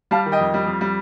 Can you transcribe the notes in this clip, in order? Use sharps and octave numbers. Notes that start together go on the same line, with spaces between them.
G3 F5 A5
D#3
D#5 G5
F2
G3
F2
G3